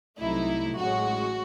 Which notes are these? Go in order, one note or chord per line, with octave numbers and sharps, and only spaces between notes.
C2 C3 F#3 A3 D#4 E4
A1 A2 G#3 C#4 F#4